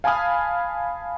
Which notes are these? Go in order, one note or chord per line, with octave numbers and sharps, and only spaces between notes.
F5 G#5 A5 B5 D#6 F6